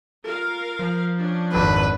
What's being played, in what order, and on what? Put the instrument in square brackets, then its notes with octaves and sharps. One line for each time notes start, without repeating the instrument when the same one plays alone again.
[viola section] F4 A#4 F5
[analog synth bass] F3
[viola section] C#4 D4
[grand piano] G#1 F2 [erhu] B4